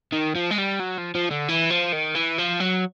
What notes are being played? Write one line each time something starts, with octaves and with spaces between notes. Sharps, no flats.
D#3
F3
G#3
G3
F#3
F3
F3
D3
E3
F3
D#3
E3
F3
F#3